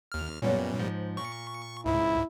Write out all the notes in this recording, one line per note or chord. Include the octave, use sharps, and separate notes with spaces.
D#2 F6
F#2 A#2 G3 B3 C#4
G#2 F3
A#2 C#6
C#2 G#2 E4